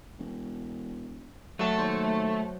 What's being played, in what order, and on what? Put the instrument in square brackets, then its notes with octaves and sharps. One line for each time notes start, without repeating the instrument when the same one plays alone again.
[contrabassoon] E1
[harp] F#3 A5 [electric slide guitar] A3 A4
[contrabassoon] D#2 [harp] C5 C#5